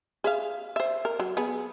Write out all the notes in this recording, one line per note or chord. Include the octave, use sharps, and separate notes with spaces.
G#4 E5 F5
C5 E5
A#4
F#3
B3 G#4